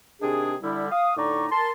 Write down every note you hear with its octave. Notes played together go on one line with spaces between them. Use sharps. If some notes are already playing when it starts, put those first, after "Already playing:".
C3 D#3 D4 G#4
D3 G3 E4
F5 D#6
A2 D3 D#4 D5 A#5 C#6
A#4 A5 C6